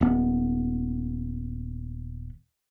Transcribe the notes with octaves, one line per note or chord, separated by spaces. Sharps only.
D#1 B3